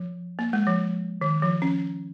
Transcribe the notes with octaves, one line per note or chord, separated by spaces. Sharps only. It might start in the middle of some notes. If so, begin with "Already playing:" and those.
Already playing: F3
A#3
G#3
F3
D#3
F3
C#4